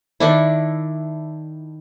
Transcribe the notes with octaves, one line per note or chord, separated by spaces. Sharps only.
D#3 D4 E4